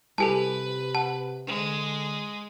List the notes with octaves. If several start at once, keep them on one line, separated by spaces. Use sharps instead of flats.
C3 G3 E4 G4 A4 B4 G#5 A5
F#5 A5
D3 G#3